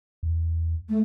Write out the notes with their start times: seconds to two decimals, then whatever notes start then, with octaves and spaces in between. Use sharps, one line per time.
0.23 E2
0.89 A3